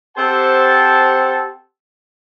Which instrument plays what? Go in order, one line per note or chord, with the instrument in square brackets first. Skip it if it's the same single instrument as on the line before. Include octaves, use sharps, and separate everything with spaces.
[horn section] C4 G4 A4 C5 F#5 A5